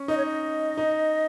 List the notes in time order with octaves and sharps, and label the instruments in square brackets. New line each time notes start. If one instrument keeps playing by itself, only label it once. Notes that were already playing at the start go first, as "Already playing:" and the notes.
Already playing: [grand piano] C#4
[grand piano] D#4 [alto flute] D#5
[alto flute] C#5
D#5
[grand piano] D#4